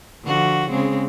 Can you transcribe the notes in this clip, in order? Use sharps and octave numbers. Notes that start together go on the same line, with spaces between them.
D3 F3 F#4
C#3 G#3 C4